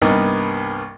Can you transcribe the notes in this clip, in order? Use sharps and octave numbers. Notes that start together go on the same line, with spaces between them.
C2 G2 A#3 B3 D#4 A#4